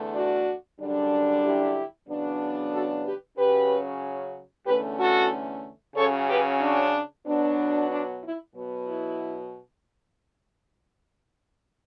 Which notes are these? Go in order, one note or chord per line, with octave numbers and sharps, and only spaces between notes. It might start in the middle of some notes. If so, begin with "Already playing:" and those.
Already playing: E2 D3 A3
D4 F#4
F#2 D3 G3 D4
E4 G4
E2 C#3 F#3 B3 D4
F#4 A4
G4 B4
C#3 F#3 C#4 G4 B4
E2 D3 A3 C#4 G4 B4
F#4 A4
C#3 F#3 C#4 A4 C#5
G4 B4
D4
B2 F#3 B3 D4
D4
E4
B2 F#3 B3
E4